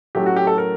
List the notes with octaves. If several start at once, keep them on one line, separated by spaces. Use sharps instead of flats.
A2 F#3 A3 C#4 E4 G4
F#4
G4
A4
A#4